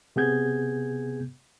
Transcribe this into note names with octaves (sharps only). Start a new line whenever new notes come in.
C3 B3 G#4 G6 G#6